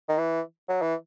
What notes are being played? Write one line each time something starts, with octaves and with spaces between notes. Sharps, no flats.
D#3
E3
F#3
E3